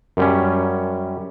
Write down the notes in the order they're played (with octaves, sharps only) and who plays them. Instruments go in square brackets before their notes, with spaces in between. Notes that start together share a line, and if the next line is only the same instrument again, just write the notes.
[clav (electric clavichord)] F#2 G3 C#4